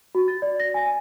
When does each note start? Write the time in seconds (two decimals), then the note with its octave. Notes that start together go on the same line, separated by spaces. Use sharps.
0.15 F#4
0.28 A6
0.42 D5
0.60 A#6
0.74 G#5
0.86 G#5